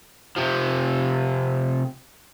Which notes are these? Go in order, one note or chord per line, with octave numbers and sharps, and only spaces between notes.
C3 F3